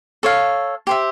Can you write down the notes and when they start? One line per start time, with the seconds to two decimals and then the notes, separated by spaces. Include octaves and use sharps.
0.23 A4 C#5 F5
0.87 G4 C5 E5